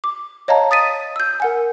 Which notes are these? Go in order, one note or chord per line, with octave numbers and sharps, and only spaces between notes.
D6
C#5 D#5 F5 A5 A#5
D#6 A6 B6 D#7
E6 G6
A#4 F#5 G#5